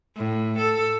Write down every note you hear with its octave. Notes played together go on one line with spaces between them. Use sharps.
A2
A4